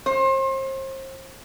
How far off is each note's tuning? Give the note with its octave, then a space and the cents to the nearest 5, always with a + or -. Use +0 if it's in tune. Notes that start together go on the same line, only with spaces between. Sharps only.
C5 +35